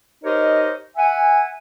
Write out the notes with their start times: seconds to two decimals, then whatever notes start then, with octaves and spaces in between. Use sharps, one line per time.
0.24 D#4 G4 A#4 C5 C#5 D#5
0.96 E5 F#5 G#5